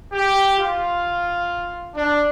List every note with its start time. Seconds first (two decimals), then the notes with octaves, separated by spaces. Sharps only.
0.13 G4
0.59 F4
1.95 D4